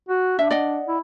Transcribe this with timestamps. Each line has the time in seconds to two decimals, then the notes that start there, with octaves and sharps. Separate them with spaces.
0.09 F#4
0.39 D4 E5
0.51 D5 D#5 F#5
0.88 E4